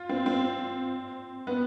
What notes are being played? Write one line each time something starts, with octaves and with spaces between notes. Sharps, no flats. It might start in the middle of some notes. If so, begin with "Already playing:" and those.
Already playing: F4
C4
C4
B3